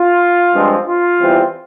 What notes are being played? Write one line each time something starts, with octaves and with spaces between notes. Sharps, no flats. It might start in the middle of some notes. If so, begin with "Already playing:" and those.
Already playing: F4
G2 F3 G#3 C4
F4
E2 E3 G3 C4